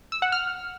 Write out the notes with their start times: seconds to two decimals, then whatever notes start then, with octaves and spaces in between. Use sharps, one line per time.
0.12 E6
0.22 F#5
0.32 F6